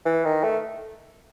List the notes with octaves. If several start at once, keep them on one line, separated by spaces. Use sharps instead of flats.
E3
D#3
A3